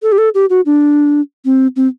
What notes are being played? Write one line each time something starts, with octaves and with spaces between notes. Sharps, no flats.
A4
G4
A4
G4
F#4
D4
C4
C4